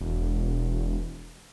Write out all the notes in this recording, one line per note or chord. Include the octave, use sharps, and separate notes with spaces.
E1